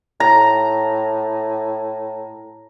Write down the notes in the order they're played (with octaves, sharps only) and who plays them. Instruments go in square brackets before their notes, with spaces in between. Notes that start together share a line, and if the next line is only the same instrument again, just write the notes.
[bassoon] A2 [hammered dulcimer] A#5